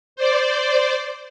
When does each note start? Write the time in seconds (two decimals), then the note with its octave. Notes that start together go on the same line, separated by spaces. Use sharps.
0.16 C5 D5